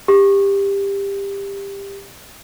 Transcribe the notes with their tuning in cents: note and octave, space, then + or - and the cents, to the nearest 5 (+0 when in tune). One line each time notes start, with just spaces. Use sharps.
G4 +20